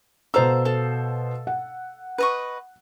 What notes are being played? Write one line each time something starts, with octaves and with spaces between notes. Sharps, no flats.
B2 A4 C5 F5 A#5 E6
A4 F5
F#5
B4 D#5 C#6